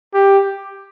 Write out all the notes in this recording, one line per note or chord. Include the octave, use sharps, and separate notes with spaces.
G4